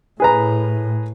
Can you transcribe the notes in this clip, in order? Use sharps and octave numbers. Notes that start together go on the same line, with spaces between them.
A2 G#4 B4 A#5